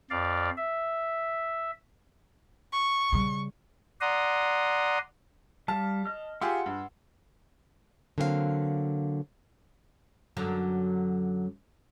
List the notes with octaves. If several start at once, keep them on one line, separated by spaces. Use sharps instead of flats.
F2 D5 F5
E5
C#6
C#3 G3
D5 F#5 A#5 C6 D#6
G3 F5 A5 F6
D#5 F6
F4 G4 G#4 F#5 C6 E6
G2
D3 F#3 A#3 C4 A4 F5
F#2 D3 F#3